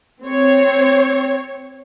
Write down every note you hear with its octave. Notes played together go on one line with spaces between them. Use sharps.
C4 C#5